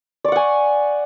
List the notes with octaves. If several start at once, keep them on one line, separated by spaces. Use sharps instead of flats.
D5 F#5 G#5 C#6